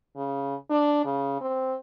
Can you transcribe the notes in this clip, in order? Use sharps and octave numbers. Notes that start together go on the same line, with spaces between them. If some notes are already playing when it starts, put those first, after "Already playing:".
C#3
D4
C#3
C4